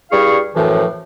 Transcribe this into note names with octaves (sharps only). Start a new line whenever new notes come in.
G2 G3 E4 G#4 F5 C#6
F#2 A2 E3 F3